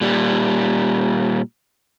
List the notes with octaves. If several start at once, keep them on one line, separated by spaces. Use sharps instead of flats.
A#2 G3